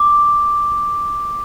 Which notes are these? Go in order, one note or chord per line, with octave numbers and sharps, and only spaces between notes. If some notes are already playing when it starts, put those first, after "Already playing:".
Already playing: D6